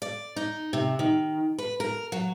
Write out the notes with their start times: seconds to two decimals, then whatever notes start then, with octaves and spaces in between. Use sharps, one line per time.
0.02 D5
0.36 D#4
0.73 C3
0.99 D#3
1.58 B4
1.80 A#4
2.12 F#3